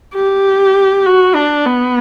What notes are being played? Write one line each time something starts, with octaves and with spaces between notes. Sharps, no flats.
G4
F#4
D4
B3